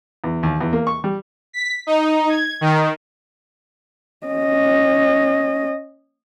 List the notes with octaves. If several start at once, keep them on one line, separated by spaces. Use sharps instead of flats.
E2
D#2
E2
A#3
C#6
G3
B6
D#4
G#6
D#3
C#4 D#5